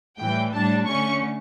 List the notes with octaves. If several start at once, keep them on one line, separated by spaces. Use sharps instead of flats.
A2 E3 G3 G5
A2 G3 D4 A5
D3 A3 C#4 C#6